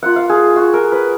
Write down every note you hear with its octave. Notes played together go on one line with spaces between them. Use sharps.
A#3 F4 F#5
F5
G#4
F#4
A#4
B4